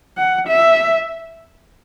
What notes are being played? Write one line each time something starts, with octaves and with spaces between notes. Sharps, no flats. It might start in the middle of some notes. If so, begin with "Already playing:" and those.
F#5
E5